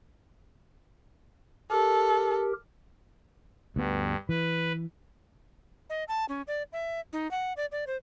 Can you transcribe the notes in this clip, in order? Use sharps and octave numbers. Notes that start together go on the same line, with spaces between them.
G4 A4 A#4
D2 G2 B3
E3 B4
D#5
A5
C#4
D5
E5
D#4
F#5
D5
D5
C5